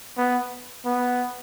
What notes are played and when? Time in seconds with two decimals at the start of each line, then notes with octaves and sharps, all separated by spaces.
0.17 B3
0.85 B3